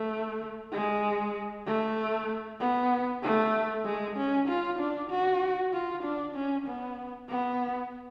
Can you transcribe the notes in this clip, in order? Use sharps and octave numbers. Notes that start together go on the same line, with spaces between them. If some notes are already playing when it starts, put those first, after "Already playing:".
Already playing: A3
G#3
A3
B3
A3
G#3
C#4
F4
D4
F#4
F4
D4
C#4
B3
B3